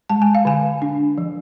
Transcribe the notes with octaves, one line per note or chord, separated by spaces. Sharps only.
G#3 A5
G#5
F5
D3 G#5
D4
F3